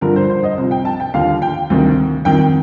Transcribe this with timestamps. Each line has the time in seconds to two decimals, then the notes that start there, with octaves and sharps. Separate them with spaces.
0.01 G2 D3 F3 A#4
0.16 C5
0.30 C5
0.44 D#5
0.58 C2 C3 F3
0.71 G5
0.85 A5
1.00 G5
1.14 D#2 D3 F3 F5
1.42 G5
1.70 D2 C3 D#3
2.25 F2 D#3 G5